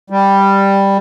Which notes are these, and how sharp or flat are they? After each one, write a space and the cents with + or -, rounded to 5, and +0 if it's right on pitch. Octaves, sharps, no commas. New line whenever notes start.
G3 +5